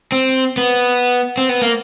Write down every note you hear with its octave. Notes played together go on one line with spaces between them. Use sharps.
C4
B3
C4
B3
A#3